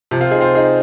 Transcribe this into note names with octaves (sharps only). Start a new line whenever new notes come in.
C3 F3
C4 F4
D#4 G#4
C4 F4
D#4 G#4